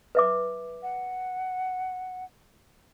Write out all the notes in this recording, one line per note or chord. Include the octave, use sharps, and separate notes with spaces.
B4 E5 D6
F#5